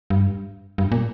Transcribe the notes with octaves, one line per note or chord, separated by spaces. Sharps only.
G2
G2
A#2